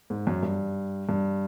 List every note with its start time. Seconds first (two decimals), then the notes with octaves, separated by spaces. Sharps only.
0.10 G#2
0.27 F#2
0.43 G2
1.09 G2